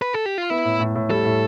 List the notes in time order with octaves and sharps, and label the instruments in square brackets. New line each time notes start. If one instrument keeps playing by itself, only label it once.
[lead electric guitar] B4
A4
G4
F4
[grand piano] B3 [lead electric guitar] E4
[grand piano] A2
A2
A2
[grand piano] G3 [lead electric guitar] A4
[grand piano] A2